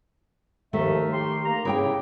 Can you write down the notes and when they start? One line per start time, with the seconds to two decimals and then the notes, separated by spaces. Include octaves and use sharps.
0.73 D#2 D#3 F3 A3 E5
1.13 G4 C6
1.45 A#3 A#5
1.65 C#3 E4 G4 G5